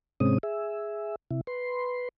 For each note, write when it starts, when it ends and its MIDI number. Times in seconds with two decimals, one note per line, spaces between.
0.20 0.38 44
0.20 0.38 48
0.20 0.38 56
0.20 0.38 60
0.20 0.38 61
0.20 0.38 87
0.43 1.16 68
0.43 1.16 76
1.31 1.41 48
1.31 1.41 64
1.47 2.09 71
1.47 2.09 84